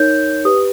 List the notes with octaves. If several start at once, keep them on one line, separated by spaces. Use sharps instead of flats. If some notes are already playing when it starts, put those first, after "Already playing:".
Already playing: D#4 A#4 C#5 G6
G4 B4 D#6